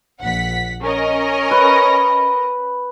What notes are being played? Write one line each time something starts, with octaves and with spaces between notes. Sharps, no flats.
A#1 F#5 B6
C#4 A#4 D#5
B4